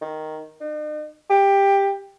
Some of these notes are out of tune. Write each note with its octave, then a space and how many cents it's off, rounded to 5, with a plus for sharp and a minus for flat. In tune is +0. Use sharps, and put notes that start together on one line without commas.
D#3 +0
D#4 -45
G4 +15